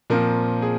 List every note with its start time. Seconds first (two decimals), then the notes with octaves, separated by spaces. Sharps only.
0.10 A#2 F3 C4 A#4
0.62 G#4